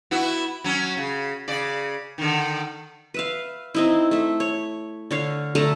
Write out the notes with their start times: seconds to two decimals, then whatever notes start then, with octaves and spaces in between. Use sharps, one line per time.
0.11 B3 E4 F#4
0.64 F#3 C#4
0.97 C#3
1.48 C#3 D5
2.18 D3 D#3
3.14 B4 E5 F5
3.75 C4 D#4 E4
4.11 A3 E5
4.40 C#5
5.11 D3 C#5 F5
5.55 D3 A3 A4 A#5